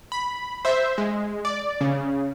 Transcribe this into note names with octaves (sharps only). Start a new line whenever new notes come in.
B5
C5 E5
G#3
D5
C#3